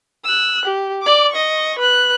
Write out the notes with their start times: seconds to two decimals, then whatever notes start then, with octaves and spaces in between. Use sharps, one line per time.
0.24 E6 F#6
0.65 G4
1.02 D5 D6
1.32 D#5 C#6
1.79 B4 F#6